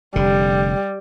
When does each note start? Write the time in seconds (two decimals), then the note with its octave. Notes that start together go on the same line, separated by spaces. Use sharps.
0.16 F1 D3 G3